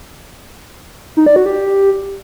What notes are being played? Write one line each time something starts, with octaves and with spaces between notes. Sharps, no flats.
D#4
D5
F#4
G4